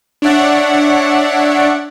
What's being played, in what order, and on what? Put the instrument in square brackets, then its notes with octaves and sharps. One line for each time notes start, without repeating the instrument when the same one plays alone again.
[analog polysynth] D4 C#5 D5 E5 F#5